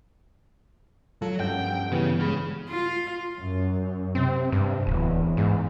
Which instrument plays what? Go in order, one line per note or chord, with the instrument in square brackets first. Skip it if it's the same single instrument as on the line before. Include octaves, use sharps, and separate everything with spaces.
[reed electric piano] F3 F4 [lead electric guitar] F#3 [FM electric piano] A4
[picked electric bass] G2 F3 [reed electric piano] C#4 F#5 G6 [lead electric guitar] G5
[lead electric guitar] C#3 [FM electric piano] E3 G3 B3
[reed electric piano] G#3 B5 F6 [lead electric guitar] C#4 G#4
[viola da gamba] F4
[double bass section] F#2
[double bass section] C3 [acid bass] C4
[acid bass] G2
[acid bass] D1 [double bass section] E2
[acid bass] G#2